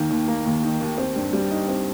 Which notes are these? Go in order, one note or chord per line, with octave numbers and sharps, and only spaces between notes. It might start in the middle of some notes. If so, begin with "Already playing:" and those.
Already playing: D#2 D#3 A#3
D#2
A#3
D#2
D#3
D#2
C4
G2
G3
D#4
C4